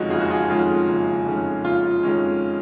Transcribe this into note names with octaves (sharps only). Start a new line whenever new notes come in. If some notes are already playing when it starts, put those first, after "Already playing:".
Already playing: F#1 F2 D#3 G#3 C#4 D#4 F4 F#4
F#1 F4 G#4
F#4
F4 G#4
F2 D#3 G#3 C#4 F4
F#1
F2 D#3 G#3 C#4
F#1 F4
F2 D#3 G#3 C#4